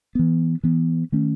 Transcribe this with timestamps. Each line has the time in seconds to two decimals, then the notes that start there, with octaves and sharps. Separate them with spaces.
0.15 E3 B3
0.63 E3 B3
1.12 D#3 A3 C#4